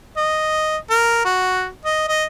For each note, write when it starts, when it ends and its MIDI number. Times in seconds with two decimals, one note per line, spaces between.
0.17 0.77 75
0.90 1.22 70
1.25 1.69 66
1.85 2.04 75
2.08 2.25 75